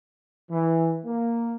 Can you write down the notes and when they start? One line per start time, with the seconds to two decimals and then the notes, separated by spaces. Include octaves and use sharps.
0.51 E3
1.04 A#3